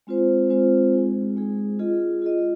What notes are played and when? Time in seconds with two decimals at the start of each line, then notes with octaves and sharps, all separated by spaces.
0.07 G#3 C4 F4 C5
0.50 G#3 C4 F4 C5
0.93 G#3 D#4 G#4
1.36 G#3 D#4 G#4
1.79 F4 G#4 D#5
2.22 F4 G#4 D#5